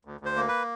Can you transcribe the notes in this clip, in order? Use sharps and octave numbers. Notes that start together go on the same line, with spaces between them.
D2
D2
C5
A#3
B4